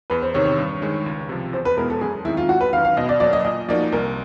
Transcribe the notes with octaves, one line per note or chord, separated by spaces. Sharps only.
E2 B4
C5
C3 D#3 C#5
C#5
G2
D#3 G#3
C#2
C3 F3
E2 C5
B4
B2 G#3 B3 E4 A#4
A4
F#2 G#4
D#3 G#3 C4 E4
F4
G#1 F#4
B4
F#2 D#3 F5
F5
B2 D#5
D5
F#3 A#3 D5
D#5
A#2 D#5
F3 A#3 D#4 F#4 D5
C2 A#4